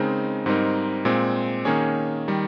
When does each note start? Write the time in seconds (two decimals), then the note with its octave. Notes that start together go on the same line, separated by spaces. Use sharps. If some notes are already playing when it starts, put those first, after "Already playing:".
Already playing: C#3 G#3 C4 D#4 A#4
0.46 G#2 G3 C4 D#4 A#4
1.05 A#2 G#3 C4
1.65 D#3 A#3 C#4 G#4 C#5
2.28 D#3 G3